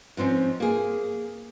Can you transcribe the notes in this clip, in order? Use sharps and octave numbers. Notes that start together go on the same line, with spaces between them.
G#2 F3 C4 C#4
A#3 G#4